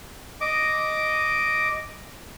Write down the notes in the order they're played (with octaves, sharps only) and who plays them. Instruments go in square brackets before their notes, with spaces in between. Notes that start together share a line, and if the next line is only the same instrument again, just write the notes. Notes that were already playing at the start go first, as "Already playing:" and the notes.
[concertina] D#5 D6